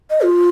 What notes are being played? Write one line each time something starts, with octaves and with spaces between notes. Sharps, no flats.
D#5
F4